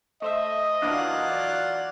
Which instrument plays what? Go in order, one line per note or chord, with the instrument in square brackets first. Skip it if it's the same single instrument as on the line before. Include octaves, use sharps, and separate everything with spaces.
[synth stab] A3 C5 E5 [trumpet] D#5
[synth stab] E3 A#3 D4 [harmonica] F#3 F4 F#5
[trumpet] D5